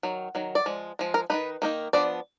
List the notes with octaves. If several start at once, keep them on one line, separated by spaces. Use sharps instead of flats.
D#3 F#3
D#3 F#3
D5
F3 G#3
F3 G#3
A#4
D#3 A#3 D#4 B4
D#3 A#3 D#4
F3 B3 D4 D5